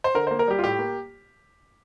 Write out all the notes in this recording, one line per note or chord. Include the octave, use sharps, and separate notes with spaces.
C5
D3 A#4
C5
A#3
A#4
G3 G4
F4
A2 G4
A#3